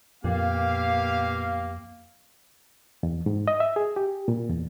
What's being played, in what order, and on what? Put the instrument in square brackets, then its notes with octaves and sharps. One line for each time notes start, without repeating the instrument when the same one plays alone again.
[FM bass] F2 [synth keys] A#2 [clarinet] A#3 [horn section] B3 G4 F5
[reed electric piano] E2
G#2
D#5
E5
G#4
G4
A#2
E2